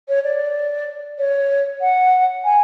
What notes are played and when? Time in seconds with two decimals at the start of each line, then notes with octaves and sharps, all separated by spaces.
0.08 C#5
0.24 D5
1.18 C#5
1.81 F#5
2.44 G#5